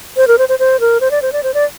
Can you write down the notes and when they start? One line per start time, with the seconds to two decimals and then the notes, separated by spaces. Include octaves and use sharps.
0.17 C5
0.28 A#4
0.38 C5
0.49 C5
0.59 C5
0.80 A#4
1.00 C5
1.11 D5
1.22 C5
1.33 D5
1.43 C5
1.54 D5